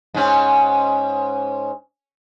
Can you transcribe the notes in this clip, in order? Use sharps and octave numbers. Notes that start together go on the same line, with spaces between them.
G#2 C#4